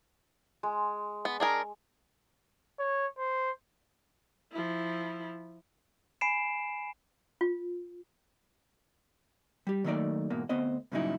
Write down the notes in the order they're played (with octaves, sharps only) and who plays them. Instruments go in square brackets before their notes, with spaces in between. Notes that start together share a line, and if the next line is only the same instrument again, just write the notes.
[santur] G#3
[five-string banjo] B3
D4 G#4 A#4
[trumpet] C#5
C5
[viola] F3 E4
[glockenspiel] G#5 B5 C7 D7 E7
[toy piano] F4
[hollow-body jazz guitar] G3 G4
D#3 F#3 A3 A#3 D#4 D5
E2 G#2 B2 A#3
D2 B3 C4 C5 D#5
G2 A#2 C#3 F#3 D#4 E4